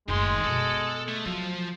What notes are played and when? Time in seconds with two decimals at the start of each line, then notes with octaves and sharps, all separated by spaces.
0.08 F#1 A2 D#3 G#3 C6
0.44 B2 B3 A4
1.08 A3
1.25 F3 F#3